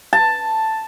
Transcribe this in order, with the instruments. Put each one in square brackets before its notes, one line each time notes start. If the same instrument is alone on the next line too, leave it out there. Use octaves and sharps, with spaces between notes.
[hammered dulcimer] A5